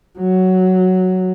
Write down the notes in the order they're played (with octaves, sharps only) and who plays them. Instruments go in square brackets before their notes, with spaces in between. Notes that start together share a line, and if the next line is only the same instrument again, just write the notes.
[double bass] F#3